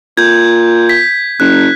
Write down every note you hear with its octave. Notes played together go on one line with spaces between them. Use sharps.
A#2 G6 G#6
G#6 B6
F#1 F#6